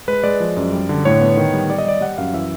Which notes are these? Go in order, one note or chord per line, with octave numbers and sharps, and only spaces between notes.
G#3 B4
G#3 D5
F3
F#2
G3
D3
A2 C#5
B3
D#3
G3
G3 D5
D#5
G3 D5
G3 F#5
F#2 F5
E3 E5